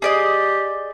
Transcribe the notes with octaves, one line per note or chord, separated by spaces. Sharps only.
G4 G#4 D5 D#5